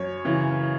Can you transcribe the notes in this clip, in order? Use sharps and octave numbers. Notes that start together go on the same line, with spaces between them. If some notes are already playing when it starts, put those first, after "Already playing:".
Already playing: F#2 C#5
C#3 E3